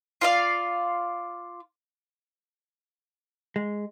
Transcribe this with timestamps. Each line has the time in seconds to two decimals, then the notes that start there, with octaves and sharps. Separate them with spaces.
0.21 F4 D5 F5
3.56 G#3